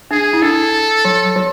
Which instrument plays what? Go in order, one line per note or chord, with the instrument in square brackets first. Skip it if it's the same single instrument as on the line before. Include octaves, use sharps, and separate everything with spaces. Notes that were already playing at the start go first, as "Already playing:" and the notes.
[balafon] D4 [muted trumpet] G#4
[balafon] E4
[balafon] D4 [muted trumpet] A4
[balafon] F#3
F#3